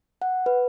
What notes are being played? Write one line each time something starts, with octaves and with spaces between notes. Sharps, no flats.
F#5
B4